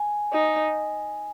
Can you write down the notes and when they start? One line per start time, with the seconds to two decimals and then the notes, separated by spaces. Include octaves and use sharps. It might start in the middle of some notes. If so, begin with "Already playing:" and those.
Already playing: G#5
0.33 D#4